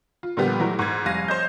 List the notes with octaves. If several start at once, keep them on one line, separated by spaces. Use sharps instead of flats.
F4
A#2 D3 F3 G3 B3 G4
E3 F#3 A3 A#4
G#2 G#6
F1 G3 F5 A#6 D#7
C5 C#5 D#5 G6